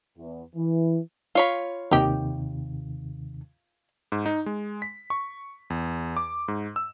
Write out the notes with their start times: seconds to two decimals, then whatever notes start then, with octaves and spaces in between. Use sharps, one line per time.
0.17 E2
0.55 E3
1.35 F4 C#5 B5
1.91 D#2 C3 D#3 D#4 G4
4.12 G#2
4.26 D#4
4.46 G#3
4.82 B6
5.10 C#6
5.70 E2
6.17 D6
6.48 G#2
6.76 E6